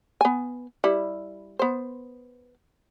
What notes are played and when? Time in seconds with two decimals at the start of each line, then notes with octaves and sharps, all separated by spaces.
0.21 B3 G#5
0.84 G3 E4
1.59 B3 C5